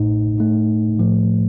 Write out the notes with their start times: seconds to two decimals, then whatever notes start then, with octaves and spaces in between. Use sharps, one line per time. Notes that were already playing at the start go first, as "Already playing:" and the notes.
Already playing: A1 A2 A3 D#4
0.38 A2 A3 D#4
0.99 A2 F3 A3